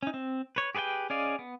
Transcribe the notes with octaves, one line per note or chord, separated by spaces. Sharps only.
C#4 D#4
C4
B4 C#5
G4 G#4 B4 C#5 G5
C#4 G#4 D5 D#5 F5
B3